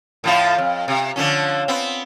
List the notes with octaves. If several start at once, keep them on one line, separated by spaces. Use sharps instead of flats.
A2 F3 F4
F2
C3
D3 F3 C#4
B3 C4